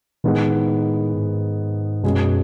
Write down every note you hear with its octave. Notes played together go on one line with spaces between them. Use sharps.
A2 D#3 G#3 B3 D#4 G#4
G#2
F#2 B2 G#3 C#4 G#4